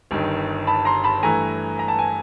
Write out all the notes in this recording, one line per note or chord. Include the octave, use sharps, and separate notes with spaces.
G1 G2 D#3
A5 B5
A#5 C6
A5 B5
G2 E3 A3 G#5 A#5
A#5
A5
G#5